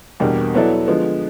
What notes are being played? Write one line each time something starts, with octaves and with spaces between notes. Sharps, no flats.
E2 B2 G3 A#3 D4
F#3 B3 E4 A4 D5
D3 F3 G#3 B3